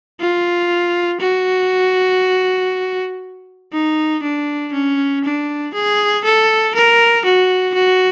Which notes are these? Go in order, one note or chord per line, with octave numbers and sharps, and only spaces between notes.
F4
F#4
D#4
D4
C#4
D4
G#4
A4
A#4
F#4
F#4